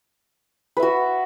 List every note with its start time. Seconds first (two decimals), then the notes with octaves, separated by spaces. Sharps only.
0.77 B4
0.80 E5
0.83 F#4